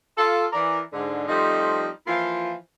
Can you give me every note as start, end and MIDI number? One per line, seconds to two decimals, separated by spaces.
0.18 0.46 65
0.18 0.46 69
0.53 0.80 52
0.53 0.80 70
0.53 0.80 74
0.93 1.23 44
0.93 1.23 50
1.28 1.87 53
1.28 1.87 55
1.28 1.87 57
1.28 1.87 60
1.28 1.87 63
2.07 2.53 52
2.07 2.53 53
2.07 2.53 58
2.07 2.53 64
2.07 2.53 65